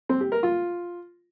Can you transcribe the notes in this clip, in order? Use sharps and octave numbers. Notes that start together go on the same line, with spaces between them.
C4
G4
A#4
F4